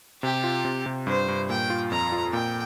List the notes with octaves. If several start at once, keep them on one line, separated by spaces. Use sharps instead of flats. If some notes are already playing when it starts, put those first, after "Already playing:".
C3 G4
F4
C3
C3
G2 C5
G2
A#2 G5
F4
F2 A#5
F4
A#2 G5